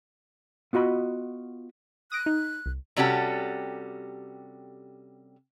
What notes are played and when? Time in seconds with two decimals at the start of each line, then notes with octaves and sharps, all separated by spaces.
0.73 B3 F4 F#4 D#5 B5
2.12 D#6 F#6 A#6 D7
2.26 D#4
2.66 C2
2.96 C3 G3 C#4 F#4 G4 A4